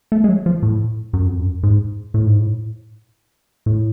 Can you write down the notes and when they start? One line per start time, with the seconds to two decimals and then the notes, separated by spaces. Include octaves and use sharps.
0.12 A3
0.24 G#3
0.29 F#3
0.46 F3
0.63 A2
1.13 F#2
1.26 F2
1.39 F#2
1.63 G#2
2.14 A2
2.26 G#2
2.39 A2
3.66 A2